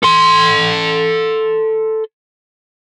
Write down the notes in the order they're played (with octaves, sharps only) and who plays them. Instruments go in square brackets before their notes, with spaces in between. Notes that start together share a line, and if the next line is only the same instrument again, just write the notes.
[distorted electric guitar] A4 C6